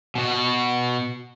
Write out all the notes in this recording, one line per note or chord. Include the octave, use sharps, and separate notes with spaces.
B2 F#4